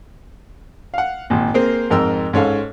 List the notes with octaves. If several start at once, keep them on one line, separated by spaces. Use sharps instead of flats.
F5 F#5
G#1 A#2
A#3 C4 G#4 A#4 C5
F2 G#2 A#4 G5 E6
G#2 C#4 A4 F5